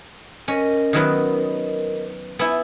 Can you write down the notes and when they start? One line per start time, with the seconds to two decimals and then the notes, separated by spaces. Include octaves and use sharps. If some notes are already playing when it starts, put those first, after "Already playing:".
0.48 C#4 A#4 D#5
0.93 D#3 F#3 B3
2.39 B3 E4 G#5